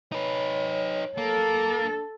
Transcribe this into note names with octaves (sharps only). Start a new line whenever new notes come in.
D#4 B4 C#5
A#3 A4
D4